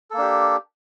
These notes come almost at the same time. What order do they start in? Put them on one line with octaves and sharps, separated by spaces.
A4 A#3 D4 G4